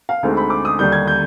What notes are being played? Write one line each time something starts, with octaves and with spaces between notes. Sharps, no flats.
F5
D2 D3 G#3 C4 D#4
B5
D6
D#6
D#2 D3 G3 D4 G6
G#6
G6